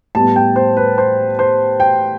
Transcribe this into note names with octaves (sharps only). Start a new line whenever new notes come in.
A2 G3 B3 A5
G5
C5
B4
C5
C5
G5